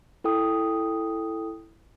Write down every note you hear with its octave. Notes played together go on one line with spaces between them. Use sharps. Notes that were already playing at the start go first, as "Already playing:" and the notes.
E4 A4 G5 D#6